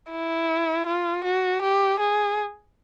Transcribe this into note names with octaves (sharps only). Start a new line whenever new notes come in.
E4
F4
F#4
G4
G#4